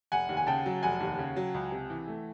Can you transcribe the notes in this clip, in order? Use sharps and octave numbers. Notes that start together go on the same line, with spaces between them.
F1 F#5 G#5
D#2
G#5
C#3 G5 A5
F#3
F1 F#5 G#5
D#2
C#3
F#3
C#2
C3
E3
A3